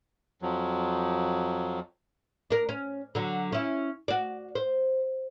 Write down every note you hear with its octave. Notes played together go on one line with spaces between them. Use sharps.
F2 F3 F#3
D4 A#4
C#4
D3 F#3
C#4 E4
F#4 D5
C5